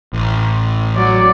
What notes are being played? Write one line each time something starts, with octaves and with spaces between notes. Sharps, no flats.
A1
F#3 D5